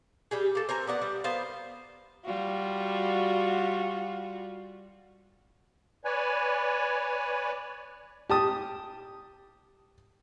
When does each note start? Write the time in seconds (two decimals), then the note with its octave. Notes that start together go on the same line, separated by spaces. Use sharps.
0.31 G3 G4 G#4
0.55 A#3 A4
0.69 C4 A#4 G#5 A#5
0.88 B3 D5 F#5
1.02 G3
1.24 B3 A#4 C5 F5
2.25 G3 F4 F#4
6.05 B4 C#5 D5 G#5
8.30 G4 A5 D#6